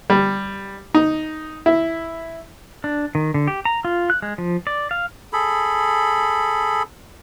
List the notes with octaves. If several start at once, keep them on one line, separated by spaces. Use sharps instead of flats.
G3
D#4
E4
D4
D#3
D3
G4
A#5
F4
F#6
G#3
F3
D5
F5
G#4 A4 B5